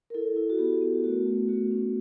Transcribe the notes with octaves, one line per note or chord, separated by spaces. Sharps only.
A#4
E4 A4
E4
F#4
B3 G4
B3
A3 F#4
A3
A3 F#4
C#4